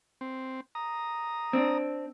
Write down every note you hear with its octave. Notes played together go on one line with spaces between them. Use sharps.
C4
A#5 D#6
C4 D4